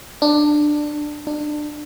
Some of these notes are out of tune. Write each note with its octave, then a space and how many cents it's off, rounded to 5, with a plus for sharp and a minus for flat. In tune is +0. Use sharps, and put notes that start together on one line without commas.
D4 +15
D4 +25